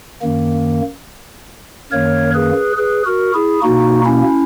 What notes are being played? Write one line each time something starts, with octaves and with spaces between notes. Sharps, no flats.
F#2 D#3 A#3
F#2 D#3 A#3 A#4 C#5
G#4 B4
G#4 B4
F#4 A#4
E4 G#4
B2 A#3 D#4 F#4
C#4 E4